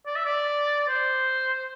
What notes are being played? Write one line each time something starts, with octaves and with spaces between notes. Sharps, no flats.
D5
E5
D5
C5